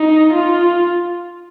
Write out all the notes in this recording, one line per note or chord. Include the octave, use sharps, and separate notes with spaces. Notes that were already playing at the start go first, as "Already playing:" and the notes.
Already playing: D#4
F4